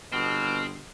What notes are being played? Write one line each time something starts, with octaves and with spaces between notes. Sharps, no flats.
G1 B2 C4 F6